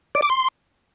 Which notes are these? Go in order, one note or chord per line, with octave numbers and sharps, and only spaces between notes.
D5
D6
C6